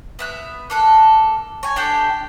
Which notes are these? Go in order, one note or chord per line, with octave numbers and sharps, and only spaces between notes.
B3 E5 F#6
A#3 A4 F#6
C#5 G#5
D4 G4 A4 G5